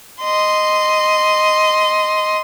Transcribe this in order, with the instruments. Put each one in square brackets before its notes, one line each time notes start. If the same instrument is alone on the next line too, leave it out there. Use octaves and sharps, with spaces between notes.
[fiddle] D#5 C6